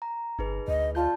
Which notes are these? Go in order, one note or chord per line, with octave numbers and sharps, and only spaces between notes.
A#5
G1 D#4 G#4 B4
D2 D#5
F4 D5 A5 G6